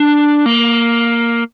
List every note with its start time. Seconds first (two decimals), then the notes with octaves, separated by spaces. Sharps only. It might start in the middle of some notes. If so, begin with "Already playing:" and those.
Already playing: D4
0.46 A#3